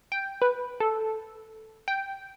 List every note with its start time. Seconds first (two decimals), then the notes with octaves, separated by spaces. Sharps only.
0.12 G5
0.42 B4
0.80 A4
1.88 G5